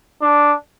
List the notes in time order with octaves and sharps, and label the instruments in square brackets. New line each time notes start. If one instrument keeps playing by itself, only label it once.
[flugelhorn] D4